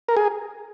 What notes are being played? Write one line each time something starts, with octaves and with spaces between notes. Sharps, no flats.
A#4
G#4